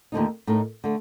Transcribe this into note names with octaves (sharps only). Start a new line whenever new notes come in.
D#2 D3 F3 A3 D#4
A2 A3 D#4 A#4
D3 A3